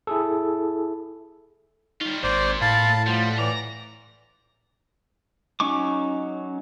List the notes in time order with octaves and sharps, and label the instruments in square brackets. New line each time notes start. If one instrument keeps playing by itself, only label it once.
[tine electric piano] E4 G#4 A4
[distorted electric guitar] G3 F4 [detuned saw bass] D#4 [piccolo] C#6
[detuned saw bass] G#1 [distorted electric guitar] A#2 [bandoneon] C5 D5
[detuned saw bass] A2 [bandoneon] F5 A5 B5 [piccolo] A6
[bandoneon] F3 F4 [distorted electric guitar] G3 [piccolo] F#5
[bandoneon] E3 D5 [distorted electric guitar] A#5
[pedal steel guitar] F#3 C#4 D#4 C#6 D6